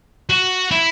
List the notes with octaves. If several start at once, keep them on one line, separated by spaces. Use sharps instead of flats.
F#4
E4